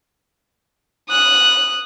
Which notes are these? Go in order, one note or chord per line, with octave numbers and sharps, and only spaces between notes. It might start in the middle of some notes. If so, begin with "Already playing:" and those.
D#6 F#6